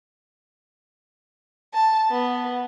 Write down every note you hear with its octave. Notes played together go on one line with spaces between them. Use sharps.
A5
B3